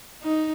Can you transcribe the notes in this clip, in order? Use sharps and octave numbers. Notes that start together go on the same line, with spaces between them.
D#4